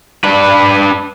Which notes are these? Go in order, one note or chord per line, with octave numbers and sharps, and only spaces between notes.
D4 B4